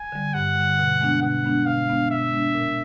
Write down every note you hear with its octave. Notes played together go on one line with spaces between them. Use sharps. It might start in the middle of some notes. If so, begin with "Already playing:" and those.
Already playing: G#5
D3 G3
G2 F#5
D3 G3
B2
G#3 B3 D4
B2 F#5
G#3 B3 D4
B2 F5
G#3 B3 D4
B2 E5
G#3 B3 D4
A#2